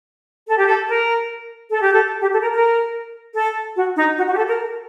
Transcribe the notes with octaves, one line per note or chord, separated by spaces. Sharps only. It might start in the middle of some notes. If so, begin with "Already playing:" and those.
A4
G4
A4
A#4
A4
G4
A4
G4
A4
A#4
A#4
A4
F#4
D#4
F#4
F#4
G4
A4
A#4